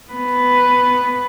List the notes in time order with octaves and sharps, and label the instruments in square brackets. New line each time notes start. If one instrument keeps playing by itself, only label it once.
[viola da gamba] B3 B4